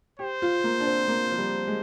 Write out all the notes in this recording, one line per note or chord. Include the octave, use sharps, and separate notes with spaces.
G4 C5
F4
A#3
D4
C4
A#3
F3
G3
G#3